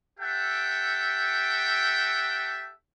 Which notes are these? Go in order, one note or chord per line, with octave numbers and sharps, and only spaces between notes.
G4 A4 E5 F#5 G5